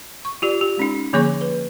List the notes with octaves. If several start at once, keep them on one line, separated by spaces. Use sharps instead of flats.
C#6
F4 G4 D5
G4
G#3 C#4 D#4
D3 F3 A#3 G#4 C#5 C#6
B4